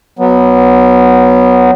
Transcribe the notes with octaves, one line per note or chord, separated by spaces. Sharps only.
F#3 B3